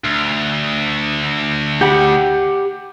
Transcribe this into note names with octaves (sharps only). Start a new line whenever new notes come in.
D2
G4 F#5 B5